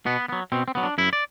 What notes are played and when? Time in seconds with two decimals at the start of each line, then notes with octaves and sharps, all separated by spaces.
0.06 B2 B3
0.29 F#3 B3
0.52 B2 C4
0.68 C4
0.75 F#3 B3
0.83 D4
0.98 F#2 E4
1.13 D5